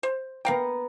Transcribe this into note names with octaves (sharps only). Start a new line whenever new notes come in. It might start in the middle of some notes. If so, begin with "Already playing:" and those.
C5
B3 A#4 F5 G5 A#5